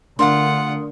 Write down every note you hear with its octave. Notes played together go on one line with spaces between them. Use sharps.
D3 A3 D4 F4 A#4 F#5 C6 D#6